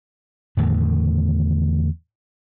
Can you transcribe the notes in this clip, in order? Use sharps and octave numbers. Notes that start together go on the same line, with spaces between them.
E2 A2 D3 D#3